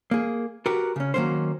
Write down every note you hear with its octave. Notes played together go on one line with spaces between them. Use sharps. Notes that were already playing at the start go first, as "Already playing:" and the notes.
A#3 G#4
F#4 G4 A#4 B4
C#3 C#4
D#3 F#3 A#3 C#4 C5